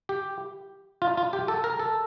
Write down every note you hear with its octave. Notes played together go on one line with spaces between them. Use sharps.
G4
F4
F4
G4
A4
A#4
A4